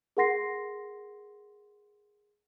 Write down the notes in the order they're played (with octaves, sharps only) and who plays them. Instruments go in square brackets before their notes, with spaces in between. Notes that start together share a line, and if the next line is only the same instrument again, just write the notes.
[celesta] G#4 A#4 F#5 C6 A#6 C7